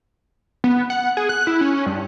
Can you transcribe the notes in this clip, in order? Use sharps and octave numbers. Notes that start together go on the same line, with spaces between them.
B3
F#5
G#4
F#6
E4
C#4
G2